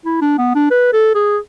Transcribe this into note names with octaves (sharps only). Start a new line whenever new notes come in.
E4
D4
B3
D4
B4
A4
G#4